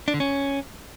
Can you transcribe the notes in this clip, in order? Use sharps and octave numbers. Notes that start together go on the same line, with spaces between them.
D4
D3
C#4